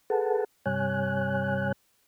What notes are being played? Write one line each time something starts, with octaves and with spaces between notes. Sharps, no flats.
G#4 A4 B4 F#5 A5
G2 C3 G3 C#5 G#5 F#6